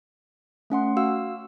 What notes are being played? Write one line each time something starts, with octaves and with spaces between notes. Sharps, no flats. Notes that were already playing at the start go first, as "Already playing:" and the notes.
A3 C#4 F#5 C6
F#4 F5 E6